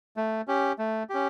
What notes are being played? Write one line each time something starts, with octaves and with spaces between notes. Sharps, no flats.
A3
C#4 G4
A3
C#4 G4